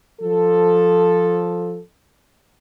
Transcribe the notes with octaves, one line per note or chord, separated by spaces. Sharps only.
F3 A4